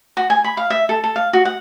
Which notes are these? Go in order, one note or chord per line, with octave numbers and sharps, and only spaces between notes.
F#4
G#5
B5
F5
E5
A4
A4
F5
F#4
F#5